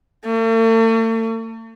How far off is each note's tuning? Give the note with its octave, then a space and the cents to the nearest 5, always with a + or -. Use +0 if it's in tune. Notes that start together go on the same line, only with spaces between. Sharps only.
A3 +45